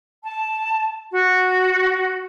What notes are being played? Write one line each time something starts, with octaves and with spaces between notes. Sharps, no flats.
A5
F#4